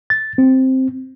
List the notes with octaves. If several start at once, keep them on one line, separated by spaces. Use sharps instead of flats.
A6
C4